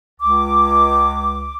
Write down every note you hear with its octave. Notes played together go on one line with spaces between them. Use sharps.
C#2 D6